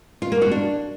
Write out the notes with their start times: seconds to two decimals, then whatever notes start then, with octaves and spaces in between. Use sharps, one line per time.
0.22 F4
0.32 A#3
0.42 F#4
0.51 D4